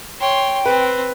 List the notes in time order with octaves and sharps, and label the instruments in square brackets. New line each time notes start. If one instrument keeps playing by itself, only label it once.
[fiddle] C#5 C6 [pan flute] G5
[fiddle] C4 [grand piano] B4